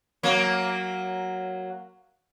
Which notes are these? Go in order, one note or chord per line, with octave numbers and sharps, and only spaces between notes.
F#3 A#3